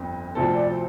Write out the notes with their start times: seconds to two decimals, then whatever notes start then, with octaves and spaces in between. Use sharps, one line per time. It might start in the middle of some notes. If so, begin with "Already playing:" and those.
Already playing: G1 F2 C4
0.35 D2 C3 F3 C4 D4 A4
0.53 D5
0.70 C5